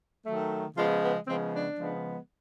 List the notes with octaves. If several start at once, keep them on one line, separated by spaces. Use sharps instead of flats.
D#3 F#3 A3
C#3 F3 G#3 B3 F4
B3
C#3 F3 G#3 B3 C4
D4
C#3 F3 G#3 B3